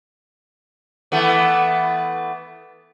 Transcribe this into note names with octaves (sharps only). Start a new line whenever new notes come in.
E3 A3 B3